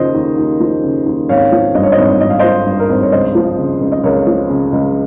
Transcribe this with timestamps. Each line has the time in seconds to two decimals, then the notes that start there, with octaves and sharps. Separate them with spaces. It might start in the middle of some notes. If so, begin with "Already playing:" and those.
Already playing: D#2 C#3 F3 C5 D#5
0.15 D#2
0.38 D#2
0.60 F3
0.83 C#3
1.06 D#2
1.29 G#1 C#5 F5
1.52 F3
1.75 G2 D#5
1.83 C#5
1.92 C5 D#5
1.97 G#1
2.21 G#1 D#5
2.30 F5
2.39 F3 C5 D#5
2.66 G2
2.79 A#4
2.89 G#1 C5
3.01 C#5
3.12 C#2 C5 D#5
3.35 F3
3.58 C#3
3.81 C#2
3.92 D#5
4.03 C#2 A#4 C#5
4.27 F3
4.49 C#3
4.72 C#2